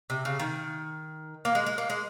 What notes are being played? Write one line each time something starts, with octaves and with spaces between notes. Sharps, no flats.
C3
C#3
D#3
A#3
G#3
G#3
A#3
G#3